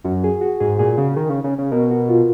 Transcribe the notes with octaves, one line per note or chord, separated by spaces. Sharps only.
F#2 F#4
G#4
F#4
G#2 G#4
A#2 G#4
C#3
D#3
C#3
C#3
C#3
B2 A#4
F#4
F4